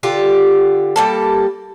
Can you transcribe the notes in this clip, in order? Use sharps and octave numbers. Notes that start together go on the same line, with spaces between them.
D3 F4 G4
G3 A#3 A4